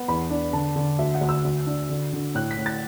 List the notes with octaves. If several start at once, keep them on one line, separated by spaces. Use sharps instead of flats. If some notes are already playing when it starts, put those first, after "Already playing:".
Already playing: B3
E2 B5
D4
D3 A5
D3
D2 E5
F#5
D2
E6
D2
D4
D3
D3
A2 F#6
B6
A2
A6